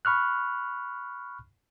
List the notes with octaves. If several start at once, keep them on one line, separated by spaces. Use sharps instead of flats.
B5 C#6 F6 F#6